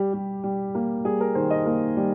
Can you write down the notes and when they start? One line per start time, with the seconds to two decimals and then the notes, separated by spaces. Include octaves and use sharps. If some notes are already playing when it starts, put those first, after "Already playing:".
Already playing: G3 G4
0.13 G3
0.43 G3
0.75 A#3
1.05 G3 G#4
1.21 A#4
1.35 D#3 C5
1.50 D#5
1.66 A#3
1.97 G3